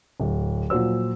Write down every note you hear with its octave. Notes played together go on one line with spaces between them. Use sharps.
D1
A#2 F3 F#3 C5 E6